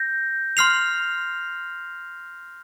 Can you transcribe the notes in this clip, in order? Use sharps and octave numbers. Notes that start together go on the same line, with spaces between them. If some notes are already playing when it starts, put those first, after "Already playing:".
Already playing: G6 A#6
C6 F6 C7 F7